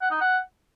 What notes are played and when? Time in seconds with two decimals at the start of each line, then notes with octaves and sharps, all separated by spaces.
0.02 F#5
0.11 D#4
0.21 F#5